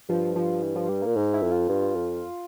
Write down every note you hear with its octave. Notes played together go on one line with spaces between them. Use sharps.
G2 F3
F3
E3
F3
G3
A#2 A#3
G#2
E4
F2
F4
G2
F2